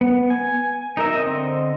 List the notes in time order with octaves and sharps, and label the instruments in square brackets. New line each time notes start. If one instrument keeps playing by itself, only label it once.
[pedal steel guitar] B3
G#5
D#4 A#4 E5
D3 C4 D#5 D#6